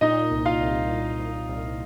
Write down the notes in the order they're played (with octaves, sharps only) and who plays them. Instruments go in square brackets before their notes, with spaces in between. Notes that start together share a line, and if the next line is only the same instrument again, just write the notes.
[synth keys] A#2 [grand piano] D#4 D#5
[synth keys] C2
[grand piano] F4 F5
[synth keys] C2
A#2
C2
C2